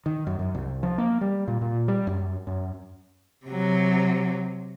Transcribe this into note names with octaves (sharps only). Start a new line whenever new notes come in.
D#3
F#2
F#2
C2
F3
A#3
G3
A#2
A#2
G3
F#2
F#2
C3 F#3